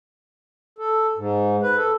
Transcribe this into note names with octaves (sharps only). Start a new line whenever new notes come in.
A4
G#2
B4
A4